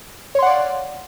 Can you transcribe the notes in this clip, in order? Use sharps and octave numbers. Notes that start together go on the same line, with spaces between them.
C#5 D5 F5 F#5 C6